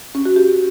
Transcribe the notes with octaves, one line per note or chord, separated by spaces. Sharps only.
C#4
F#4
G4